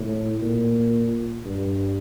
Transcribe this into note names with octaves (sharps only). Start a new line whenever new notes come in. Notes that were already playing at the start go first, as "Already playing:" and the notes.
Already playing: A2
A#2
G2